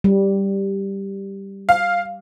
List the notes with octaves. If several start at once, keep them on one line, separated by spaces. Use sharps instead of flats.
G3
F5